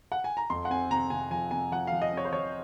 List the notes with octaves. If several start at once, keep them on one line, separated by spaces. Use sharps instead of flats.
F#5
G#5
A#5
F2 C6
F#5
C4 G#5
C3 A#5
C3 G#5
F3 G#5
C3 G#5
F3 F#5
F3 F5
D#5
C4
C#5
C5
F3 C#5